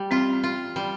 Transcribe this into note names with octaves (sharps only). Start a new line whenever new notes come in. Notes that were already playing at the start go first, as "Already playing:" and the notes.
Already playing: G3
C4 F4
F4
G3